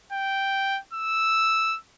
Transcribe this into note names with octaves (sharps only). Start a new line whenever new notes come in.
G5
E6